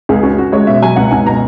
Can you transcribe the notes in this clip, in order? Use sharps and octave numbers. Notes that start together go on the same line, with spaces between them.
C#2 G#4
C#4 F#4
C#3 F#4
G#3 C#5
B2 E5
F#3 G#5
C#2 F#5
C#2 G#5
B2 A#5